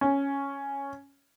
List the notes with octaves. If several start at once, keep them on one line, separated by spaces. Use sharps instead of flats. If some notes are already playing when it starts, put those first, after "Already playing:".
C#4